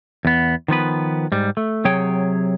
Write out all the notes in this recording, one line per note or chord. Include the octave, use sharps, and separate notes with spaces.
E2 B3
D#3 F3 B3 B4
G#2 G3
A3
C3 F#3 G#4 C#5 G5